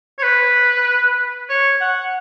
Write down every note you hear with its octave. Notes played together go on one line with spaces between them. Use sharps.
C#5
B4
C#5
F#5